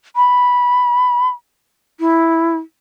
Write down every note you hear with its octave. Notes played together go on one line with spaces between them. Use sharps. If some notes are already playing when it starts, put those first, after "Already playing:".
B5
E4